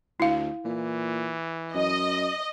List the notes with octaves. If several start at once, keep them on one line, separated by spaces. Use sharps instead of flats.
D2 E4 F5
A#2 E3
F#2 D#5